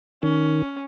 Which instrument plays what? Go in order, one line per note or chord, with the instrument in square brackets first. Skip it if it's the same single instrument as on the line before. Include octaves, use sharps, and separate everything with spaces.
[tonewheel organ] D#3 [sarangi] C#4